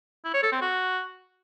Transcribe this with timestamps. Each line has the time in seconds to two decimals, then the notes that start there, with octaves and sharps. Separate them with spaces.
0.25 E4
0.34 C#5
0.43 A4
0.52 C4
0.61 F#4